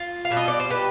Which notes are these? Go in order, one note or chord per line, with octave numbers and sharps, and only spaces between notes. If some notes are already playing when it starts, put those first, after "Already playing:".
Already playing: F4
F5
B2 G3
D#5
D5
C5
G4 B4